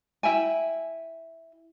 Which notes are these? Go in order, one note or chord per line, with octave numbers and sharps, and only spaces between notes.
E4 E5 G5 G#5